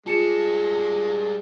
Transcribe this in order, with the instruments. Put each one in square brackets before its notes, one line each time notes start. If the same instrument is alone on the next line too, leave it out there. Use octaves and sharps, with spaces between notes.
[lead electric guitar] G3 A5 [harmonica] G#3 [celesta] F4 C#7 E7